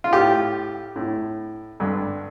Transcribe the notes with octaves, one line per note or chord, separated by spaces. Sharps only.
F4
A2 G4
A2
G2 D3